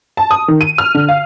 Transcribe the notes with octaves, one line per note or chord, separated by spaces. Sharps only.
A5
D#6
D#3
D#7
F6
D3
F5